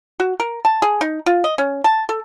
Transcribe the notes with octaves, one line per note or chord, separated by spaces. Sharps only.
F#4
A#4
A5
G#4
D#4
F4
D#5
C#4
A5
A4